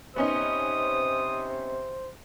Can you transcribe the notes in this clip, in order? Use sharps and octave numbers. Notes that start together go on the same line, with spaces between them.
C3 B3 C#4 D#4 C5 D#6